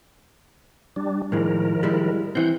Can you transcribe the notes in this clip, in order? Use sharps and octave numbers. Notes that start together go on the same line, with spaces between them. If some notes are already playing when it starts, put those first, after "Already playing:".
G3 D4
A2 D#3 F3 G#3 A#4
G3 G#3 E4
E3 C4 F#5 G6